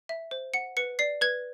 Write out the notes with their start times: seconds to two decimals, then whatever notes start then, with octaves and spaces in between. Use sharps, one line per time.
0.09 E5
0.31 C5
0.54 F#5 C#7
0.77 B4 C#7
0.99 D5 C7
1.21 B4 G#6